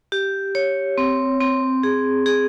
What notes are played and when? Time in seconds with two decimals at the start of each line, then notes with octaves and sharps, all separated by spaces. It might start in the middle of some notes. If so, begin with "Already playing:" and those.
0.12 G4
0.55 C#5
0.98 C4
1.40 C4
1.83 G#4
2.26 G#4